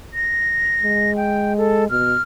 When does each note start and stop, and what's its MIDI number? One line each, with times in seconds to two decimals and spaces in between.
0.14 1.14 94
0.83 1.85 56
1.16 1.53 79
1.58 1.85 69
1.90 2.15 47
1.90 2.22 89